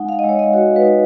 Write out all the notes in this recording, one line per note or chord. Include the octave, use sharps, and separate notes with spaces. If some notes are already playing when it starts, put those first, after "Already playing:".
Already playing: G#3 D#4 F#5
F5
G#3 D#5
C#5
D#5
F#4 C#5
B4
D#4